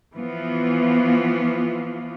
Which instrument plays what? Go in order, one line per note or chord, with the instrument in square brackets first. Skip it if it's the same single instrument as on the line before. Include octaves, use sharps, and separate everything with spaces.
[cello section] E3 F3 B3 F4